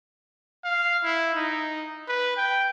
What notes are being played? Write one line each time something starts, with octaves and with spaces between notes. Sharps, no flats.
F5
E4
D#4
B4
G5